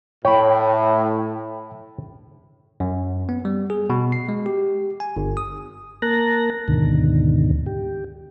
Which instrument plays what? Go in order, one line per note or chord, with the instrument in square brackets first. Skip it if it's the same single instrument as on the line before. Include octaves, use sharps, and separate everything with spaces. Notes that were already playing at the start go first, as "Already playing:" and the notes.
[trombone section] A2 [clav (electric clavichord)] C#5 [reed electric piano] G5 B5
[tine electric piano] F#2
B3
G3
G#4
B2
C7
G#3
G4
G#5
G1
D#6
[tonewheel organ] A#3 A#4 A5 A#5 F#6 A#6
D2 G#2 B2 D3 D#3
G4